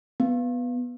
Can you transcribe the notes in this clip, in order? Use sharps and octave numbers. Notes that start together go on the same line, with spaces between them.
B3